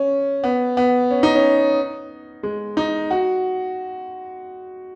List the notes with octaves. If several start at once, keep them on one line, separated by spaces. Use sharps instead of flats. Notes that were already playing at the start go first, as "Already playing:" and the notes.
Already playing: C#4
B3
B3
C#4
D#4
C#4
G#3
D#4
F#4